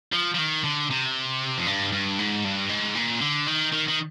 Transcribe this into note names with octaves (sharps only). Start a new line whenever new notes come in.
F3
F3
D#3
D3
C3
F2
G2
G2
G#2
G2
G#2
A#2
D3
D#3
D#3
D#3